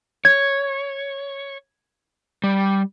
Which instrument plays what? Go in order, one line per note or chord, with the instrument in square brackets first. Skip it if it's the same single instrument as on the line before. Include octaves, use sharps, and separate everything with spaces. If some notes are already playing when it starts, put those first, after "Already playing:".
[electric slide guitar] C#5 [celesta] G#6
[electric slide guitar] G3